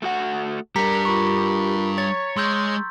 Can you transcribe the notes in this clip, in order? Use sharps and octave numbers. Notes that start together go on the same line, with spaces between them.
A3 F#4 F#5
G3 D4 G4 A#4 A#5 B6 C#7
F4 A#4 B5 C#6
C#5 C#6 A6
G#3 C6 E6 G6